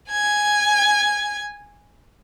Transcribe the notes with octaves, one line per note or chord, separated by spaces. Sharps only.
G#5 G#6